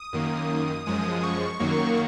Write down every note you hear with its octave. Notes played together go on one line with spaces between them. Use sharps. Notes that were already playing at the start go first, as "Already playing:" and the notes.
Already playing: D#6
F#2 D#3 A#3
F#2 F3 G#3 D#6
C#6
F#2 D#3 F#3 A#3